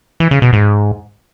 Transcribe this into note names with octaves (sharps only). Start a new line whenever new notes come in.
E3
C#3
B2
G#2